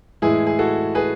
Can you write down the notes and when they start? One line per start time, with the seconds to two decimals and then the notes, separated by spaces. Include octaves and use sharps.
0.22 A2 E3 G#3 E4 G#4
0.47 G#4
0.59 F#4 A4
0.95 G#4 B4